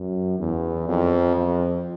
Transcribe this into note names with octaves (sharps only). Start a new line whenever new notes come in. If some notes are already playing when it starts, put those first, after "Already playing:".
Already playing: F#2
E2
F2
F2